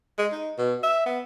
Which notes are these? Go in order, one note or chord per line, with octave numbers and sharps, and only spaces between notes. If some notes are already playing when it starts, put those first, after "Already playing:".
G#3
D#4
B2
E5
B3